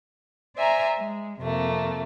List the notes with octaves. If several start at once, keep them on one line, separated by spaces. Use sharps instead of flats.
C5 D5 E5 G#5 A#5
G#3
F2 C3 A3 A#3